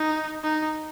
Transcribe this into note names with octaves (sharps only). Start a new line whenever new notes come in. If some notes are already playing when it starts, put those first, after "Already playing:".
Already playing: D#4
D#4